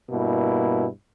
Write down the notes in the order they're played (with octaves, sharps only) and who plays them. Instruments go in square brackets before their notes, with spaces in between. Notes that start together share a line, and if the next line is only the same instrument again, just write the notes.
[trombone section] G2 B2 A#3 E4